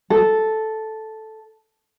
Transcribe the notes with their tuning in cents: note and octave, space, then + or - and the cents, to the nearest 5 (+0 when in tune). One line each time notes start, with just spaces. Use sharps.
A4 -5